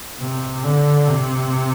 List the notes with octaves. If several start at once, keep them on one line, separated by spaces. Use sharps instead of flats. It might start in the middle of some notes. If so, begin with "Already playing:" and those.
C3
D3
C3